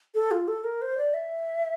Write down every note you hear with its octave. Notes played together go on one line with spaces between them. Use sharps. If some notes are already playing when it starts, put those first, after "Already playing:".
A4
F4
A4
A#4
C5
D5
E5